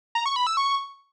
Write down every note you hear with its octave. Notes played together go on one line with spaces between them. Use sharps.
A#5
C#6
B5
E6
C#6